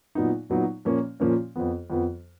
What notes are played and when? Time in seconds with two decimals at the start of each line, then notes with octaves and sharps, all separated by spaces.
0.15 A#2 F#3 B3 D#4
0.50 A#2 F#3 B3 D#4
0.85 A#2 F3 A#3 C#4
1.20 A#2 F3 A#3 C#4
1.56 F2 F3 B3
1.90 F2 F3 B3